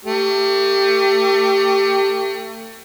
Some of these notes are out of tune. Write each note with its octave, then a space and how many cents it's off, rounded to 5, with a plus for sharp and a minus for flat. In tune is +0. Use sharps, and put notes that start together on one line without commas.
A3 +35 G4 +0